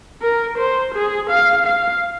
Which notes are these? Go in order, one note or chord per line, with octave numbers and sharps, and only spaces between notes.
A#4
C5
G#4
F5
F5